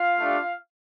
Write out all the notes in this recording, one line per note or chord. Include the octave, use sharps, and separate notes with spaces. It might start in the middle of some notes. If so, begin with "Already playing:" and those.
Already playing: F4 F5
A3 D4 G4